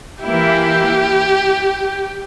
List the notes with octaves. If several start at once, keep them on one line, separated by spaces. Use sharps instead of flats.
E3 A#3 E4 G4